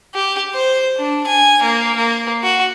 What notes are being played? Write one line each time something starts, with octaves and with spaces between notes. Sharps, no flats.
G4
C5
D4
G#5
A#3
A#3
F#4